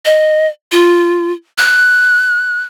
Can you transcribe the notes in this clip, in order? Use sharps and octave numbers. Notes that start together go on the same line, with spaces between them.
D#5
F4
F#6